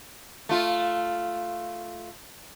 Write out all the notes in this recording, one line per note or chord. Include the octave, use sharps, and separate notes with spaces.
A3 F4